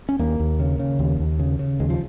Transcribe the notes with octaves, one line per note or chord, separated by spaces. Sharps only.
C#4
D#2 A#3
D#2
C#3
C#3
D#2
D#2
C#3
C#3
D#2 G#3
F3